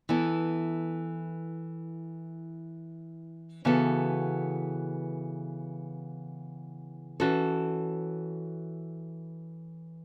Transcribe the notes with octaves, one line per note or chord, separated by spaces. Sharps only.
E3 B3 E4 A4
C#3 E3 B3 F#4 A4
E3 C#4 F#4 A4